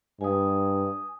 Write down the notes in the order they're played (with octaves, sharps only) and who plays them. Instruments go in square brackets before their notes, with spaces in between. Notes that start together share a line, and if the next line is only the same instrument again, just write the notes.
[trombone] G2 [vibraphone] G#5 D#6